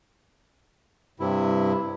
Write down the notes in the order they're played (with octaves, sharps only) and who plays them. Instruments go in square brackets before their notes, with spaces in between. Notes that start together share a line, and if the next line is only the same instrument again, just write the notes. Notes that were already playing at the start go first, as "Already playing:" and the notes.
[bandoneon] G2 C3 E4